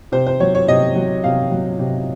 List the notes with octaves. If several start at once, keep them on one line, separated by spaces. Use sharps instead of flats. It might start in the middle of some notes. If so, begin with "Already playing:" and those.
C3 C5
C5
F#3 C#5
C#5
C3 D#5
F#3
C3 F5
F#3
C3